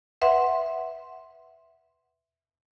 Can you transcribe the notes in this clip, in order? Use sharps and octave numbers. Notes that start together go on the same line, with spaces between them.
B4 E5 F#5 C6